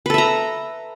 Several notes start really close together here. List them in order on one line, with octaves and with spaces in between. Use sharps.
B4 A4 E5 A#5